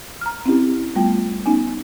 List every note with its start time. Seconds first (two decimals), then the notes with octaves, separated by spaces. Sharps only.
0.21 A#5 F6
0.45 C4 C#4 E4 G4
0.96 G3 A3 B3 F4 G5
1.46 B3 C#4 D#4 G#5